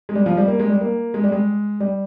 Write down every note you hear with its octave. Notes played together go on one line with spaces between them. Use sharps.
G#3
G3
F3
G3
A#3
G#3
G3
A#3
G#3
G3
G#3
G3